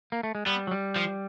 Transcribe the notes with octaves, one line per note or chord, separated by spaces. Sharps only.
A#3
A3
G#3
G3 B3
F#3
G3
F3